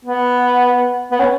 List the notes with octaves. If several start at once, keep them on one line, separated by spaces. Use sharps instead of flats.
B3
B3
C#4